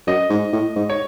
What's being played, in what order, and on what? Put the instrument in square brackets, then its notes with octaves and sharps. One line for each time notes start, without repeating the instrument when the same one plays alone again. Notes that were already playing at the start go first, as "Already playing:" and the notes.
[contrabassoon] F#2 [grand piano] D#5
[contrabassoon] G#2
A2
G#2
[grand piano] C#5